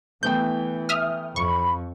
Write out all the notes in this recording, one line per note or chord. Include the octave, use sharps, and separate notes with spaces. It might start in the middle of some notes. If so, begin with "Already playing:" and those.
E3 A3 B3 G5 G6
E5 D#6 F6
F2 B5 C#6